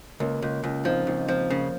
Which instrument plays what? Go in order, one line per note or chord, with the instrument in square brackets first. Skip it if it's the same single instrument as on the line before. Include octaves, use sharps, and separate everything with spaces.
[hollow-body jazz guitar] C#2 [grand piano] A#3 C#4
[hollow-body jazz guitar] C#2
C#2
[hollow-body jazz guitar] F3 [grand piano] C4 D#4
[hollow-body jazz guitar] C#2 [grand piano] C4 D#4
[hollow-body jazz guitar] F3 [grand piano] C4 D#4
[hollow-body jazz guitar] C#3 [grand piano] A#3 C#4